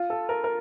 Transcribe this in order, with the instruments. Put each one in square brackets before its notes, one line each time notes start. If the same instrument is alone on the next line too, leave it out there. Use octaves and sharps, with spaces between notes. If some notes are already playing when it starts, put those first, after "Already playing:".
Already playing: [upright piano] F4
A4
A#4
A#4